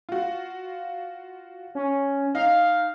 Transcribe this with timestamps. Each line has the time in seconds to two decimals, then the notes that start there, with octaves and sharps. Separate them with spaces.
0.09 F4 F#4
1.75 C#4
2.35 D#4 F5